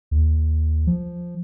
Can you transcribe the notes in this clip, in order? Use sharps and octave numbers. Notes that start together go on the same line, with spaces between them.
D#2
F3